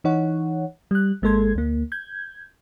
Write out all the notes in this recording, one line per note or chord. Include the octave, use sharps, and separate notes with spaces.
E3 D#4 C#5 F#5
G3 F#6
G#1 G#3 A#3 A4 C6 G#6
D2 A#3
G6 G#6